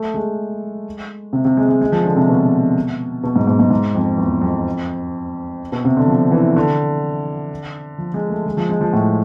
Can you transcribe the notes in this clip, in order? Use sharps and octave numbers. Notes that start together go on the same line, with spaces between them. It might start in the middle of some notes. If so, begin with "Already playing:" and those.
Already playing: A3
G#3
C3
C3
G#3
G#3
G#3
F3
D3
C3
B2
B2
G#2
G#2
G#2
G#2
F2
E2
F2
B2
C3
D3
F3
E3
D3
F3
G#3
A3
G#3
F3
G#3
F3
A2